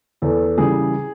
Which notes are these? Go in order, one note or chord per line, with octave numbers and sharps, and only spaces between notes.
E2 A4
C#3 E3 G3 G#4